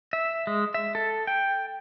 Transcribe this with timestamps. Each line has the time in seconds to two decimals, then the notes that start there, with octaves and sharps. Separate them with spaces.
0.13 E5
0.47 G#3
0.74 E5
0.95 A4
1.27 G5